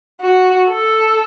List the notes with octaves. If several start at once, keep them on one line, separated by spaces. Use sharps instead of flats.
F#4
A4